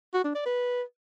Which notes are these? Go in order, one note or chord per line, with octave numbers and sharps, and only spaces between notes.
F#4
D4
D5
B4